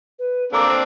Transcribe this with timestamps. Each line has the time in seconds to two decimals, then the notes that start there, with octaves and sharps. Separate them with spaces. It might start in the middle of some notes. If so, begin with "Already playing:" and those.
0.19 B4
0.53 A#3 C4 D4 A4 A#5 D6 E6